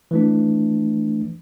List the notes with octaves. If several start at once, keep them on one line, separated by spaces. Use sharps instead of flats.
E3 A3 D4